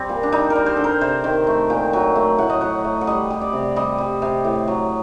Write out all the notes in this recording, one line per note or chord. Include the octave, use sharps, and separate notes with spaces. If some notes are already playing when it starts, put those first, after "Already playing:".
Already playing: G3 C4
A#2
D4
G3 D#4
A#4
G3
C5
D3 A4
A#4
C3 C5
D#3
A3
A#2 G5
F#3
A3
A2 F#5
D#5
F#3 F#5
A3
F#5
G3 D#5
G3
D5
C3
G3 D#5
G3
C3
A2
F#3